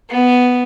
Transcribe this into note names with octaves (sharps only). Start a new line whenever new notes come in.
B3